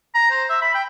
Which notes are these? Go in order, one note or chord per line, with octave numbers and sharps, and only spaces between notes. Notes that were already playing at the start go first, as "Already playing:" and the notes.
A#5
C5
E5
B5
G5